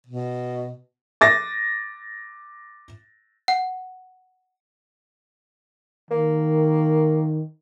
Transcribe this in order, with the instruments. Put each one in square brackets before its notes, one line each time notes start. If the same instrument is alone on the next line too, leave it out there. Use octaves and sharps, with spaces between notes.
[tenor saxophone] B2
[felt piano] D6 A6 A#6
[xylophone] F#5
[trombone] D#3 [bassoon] A#3